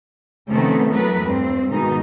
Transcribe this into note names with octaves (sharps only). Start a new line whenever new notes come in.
C3 D#3 F3 A3 B3 C#4
E3 F#3 A3 B3 A#4 B4
E2 G2 C4
G#2 B2 D#3 E3 D#4